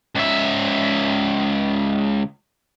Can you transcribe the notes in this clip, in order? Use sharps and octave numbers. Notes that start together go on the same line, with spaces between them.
C#2 E5